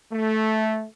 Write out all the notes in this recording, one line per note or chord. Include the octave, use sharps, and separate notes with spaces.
A3